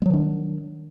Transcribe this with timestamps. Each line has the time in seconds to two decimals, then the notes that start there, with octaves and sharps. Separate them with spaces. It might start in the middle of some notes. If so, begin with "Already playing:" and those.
0.02 G#3
0.06 F#3
0.10 D#3
0.13 D4